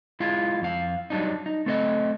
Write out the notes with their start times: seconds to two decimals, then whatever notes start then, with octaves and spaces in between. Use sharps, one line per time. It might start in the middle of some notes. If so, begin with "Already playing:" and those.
0.20 G#3 E4 F4
0.62 F2 F5
1.10 F#3 G3 D4 D#4
1.46 D#4
1.66 A3 C4 A4 C5 D#5